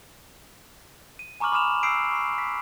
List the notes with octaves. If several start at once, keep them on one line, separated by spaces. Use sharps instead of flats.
D#7
G#5 A#5 C#6 D6 F6 F#7
B5 D6 D#6 F6 E7 F7
C#6 D#6 E6 G6 C7 D7
C#6 C7
B6